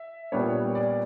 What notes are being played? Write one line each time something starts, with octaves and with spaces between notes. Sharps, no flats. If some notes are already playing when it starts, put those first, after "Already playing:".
Already playing: E5
A#2 G3 B3 D4 C#5
D5